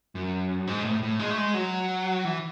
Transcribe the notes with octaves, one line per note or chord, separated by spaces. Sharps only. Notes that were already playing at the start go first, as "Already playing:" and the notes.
F#2
G#2
A2
A2
G#3
A3
G#3
F#3
E3